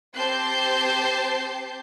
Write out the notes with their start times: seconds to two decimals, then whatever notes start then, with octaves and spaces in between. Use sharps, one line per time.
0.15 C4 G4 C5 A5 G6 C7